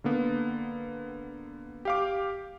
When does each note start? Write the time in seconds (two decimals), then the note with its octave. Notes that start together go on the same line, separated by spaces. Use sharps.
0.04 D3 A#3 B3
1.85 G4 F5 D6